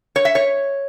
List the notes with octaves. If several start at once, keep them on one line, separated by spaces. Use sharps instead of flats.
C#5
E5
C#5